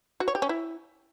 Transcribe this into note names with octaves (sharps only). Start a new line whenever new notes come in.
F#4
C#5
G4
C#4
E4